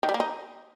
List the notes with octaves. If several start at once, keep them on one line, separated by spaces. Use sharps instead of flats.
D#3
G3
A#3
D#4